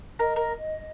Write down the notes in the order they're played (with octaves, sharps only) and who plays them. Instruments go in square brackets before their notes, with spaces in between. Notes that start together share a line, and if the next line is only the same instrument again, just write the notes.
[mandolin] A#4 [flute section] D#5
[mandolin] A#4